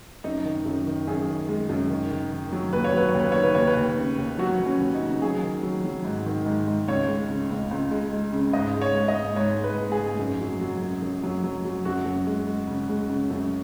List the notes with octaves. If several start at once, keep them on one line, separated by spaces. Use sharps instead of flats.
F#2 D#4
D#3
F#2
D#3
F#2 G#4
D#3
G#3
F#2
D#3
D#3
D#3
F#3
D#2 B4
C#5
F#3 B4
C#5
D#2
B4
D#3 C#5
B4
D#2 C#5
B4
D#2
C#3
D#2
F#3 F#4
F#3
C#4
D#2
D#4
C#3
F#3 G#4
D#3
F#3
F#3
G#2
D#3
G#2
G#2
C#2 C#5
G#3
C#3
C#2
C#2
G#3
G#3
C#3
G#2 D#5
G#3
C#5
G#3
D#5
G#2
G#2 C#5
G#3
B4
G#3
G#4
G#2
F#2
F#3
F#3
F#2
F#2
F#3
F#3
F#3
F#2 F#4
F#2
G#3
G#3
C#3
G#3
C#3
F#2